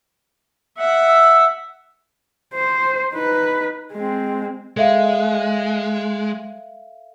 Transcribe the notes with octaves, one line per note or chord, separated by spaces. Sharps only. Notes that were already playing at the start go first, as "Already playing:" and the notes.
E5 F#5
E6
C5
D#4 B4
G#3 C4
G#3 A4 E5 F5